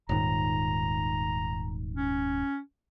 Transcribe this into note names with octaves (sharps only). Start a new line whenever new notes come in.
D#1 G#2 D#3 A#5
C#4